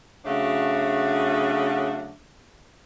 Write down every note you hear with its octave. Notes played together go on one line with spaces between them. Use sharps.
C#3 F#3 A3 D4 F#4